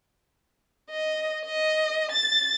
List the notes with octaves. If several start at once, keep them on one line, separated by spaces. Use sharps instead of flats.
D#5
D#5
A6